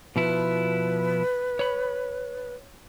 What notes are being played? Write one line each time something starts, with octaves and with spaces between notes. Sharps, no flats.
B2 F3 E4 B4
C#5 B5